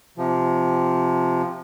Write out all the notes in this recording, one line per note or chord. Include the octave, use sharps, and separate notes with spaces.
C3 F3